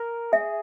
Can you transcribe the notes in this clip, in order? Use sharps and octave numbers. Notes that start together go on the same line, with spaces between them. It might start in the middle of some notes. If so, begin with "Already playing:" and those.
Already playing: A#4
G#4 E5